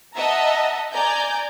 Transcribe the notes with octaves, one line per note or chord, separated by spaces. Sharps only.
D#5 E5 F#5 A5 A#5
D5 G#5 A#5 G6